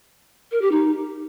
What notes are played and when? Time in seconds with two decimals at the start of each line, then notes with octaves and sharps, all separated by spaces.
0.52 A#4
0.62 G4
0.72 D#4